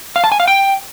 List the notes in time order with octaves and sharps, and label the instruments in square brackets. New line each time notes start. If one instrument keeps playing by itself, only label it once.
[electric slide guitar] F5
A5
G#5
F5
G5